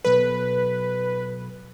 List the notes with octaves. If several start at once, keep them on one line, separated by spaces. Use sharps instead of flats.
B2 F#3 A4 B4